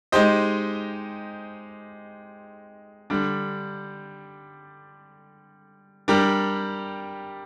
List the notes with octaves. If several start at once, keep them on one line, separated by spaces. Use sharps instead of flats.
G#3 D#4 G4 C5 D#5
D3 G3 D4
G3 D4 G4 A#4